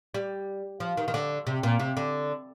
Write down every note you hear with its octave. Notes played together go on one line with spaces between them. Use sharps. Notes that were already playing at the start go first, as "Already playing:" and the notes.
G3
F3
D#3
D#3
D3
C3
A#2
C3
D3